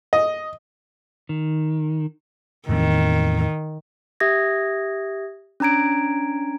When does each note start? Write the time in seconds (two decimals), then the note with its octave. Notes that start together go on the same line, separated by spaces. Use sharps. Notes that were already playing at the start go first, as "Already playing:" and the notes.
0.13 D#5
1.29 D#3
2.69 E2 A2 D#3 C4
4.20 G4 E5 D#6 G#6 A#6
5.60 C#4 D4 A#5 G#6 D7